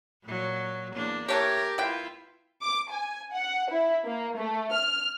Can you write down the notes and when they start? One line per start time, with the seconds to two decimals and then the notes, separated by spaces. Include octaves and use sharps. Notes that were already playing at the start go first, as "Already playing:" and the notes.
0.24 A#2 F#3
0.95 E2 A#3 D4
1.28 E3 A3 G4 A#4 C#5
1.78 B3 E4 F4 G5
2.62 D6
2.91 G#5
3.33 F#5
3.69 E4
4.05 A#3
4.37 A3
4.72 F6